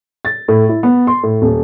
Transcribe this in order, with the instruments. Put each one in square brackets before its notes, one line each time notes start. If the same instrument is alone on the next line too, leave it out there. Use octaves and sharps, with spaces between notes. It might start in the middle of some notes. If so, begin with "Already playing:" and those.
[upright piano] A6
A2
E4
B3
C6
A2
D#1